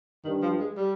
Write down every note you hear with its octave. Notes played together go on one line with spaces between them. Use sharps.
G2 D#3
F3
G#3
G3